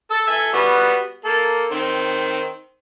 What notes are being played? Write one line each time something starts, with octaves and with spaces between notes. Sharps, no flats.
A4 A5 E6
A4 E5 G#5
G3 B3 F#4
A#3 A4
D#3 C4